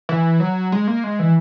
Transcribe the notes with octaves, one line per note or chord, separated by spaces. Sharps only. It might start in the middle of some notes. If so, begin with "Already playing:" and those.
E3
F#3
G#3
A#3
G#3
E3